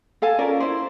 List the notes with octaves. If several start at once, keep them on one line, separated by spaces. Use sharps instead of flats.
A4 F5 G#5 A5
C#4 F4 A#4 D5
E4 C5